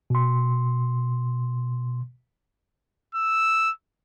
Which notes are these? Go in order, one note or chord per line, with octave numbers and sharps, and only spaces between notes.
B2 C6
E6